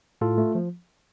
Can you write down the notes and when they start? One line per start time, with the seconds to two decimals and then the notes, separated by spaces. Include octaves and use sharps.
0.21 A2 F4 A4
0.38 A3
0.55 F3